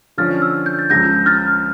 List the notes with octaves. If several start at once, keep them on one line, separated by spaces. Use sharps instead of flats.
D3 F3 C#4 F4 F6 A6
E6
F6
G6
A6
C#2 C#3 F3 G6 A#6
F6 A6